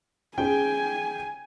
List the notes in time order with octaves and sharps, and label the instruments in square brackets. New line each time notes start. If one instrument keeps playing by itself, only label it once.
[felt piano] C#4 G#4 [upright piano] G5 [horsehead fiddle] G#5